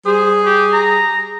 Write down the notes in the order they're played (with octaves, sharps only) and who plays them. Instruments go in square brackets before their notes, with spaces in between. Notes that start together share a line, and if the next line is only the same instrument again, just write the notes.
[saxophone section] G3 G#4 [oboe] C5
[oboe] G4
A#5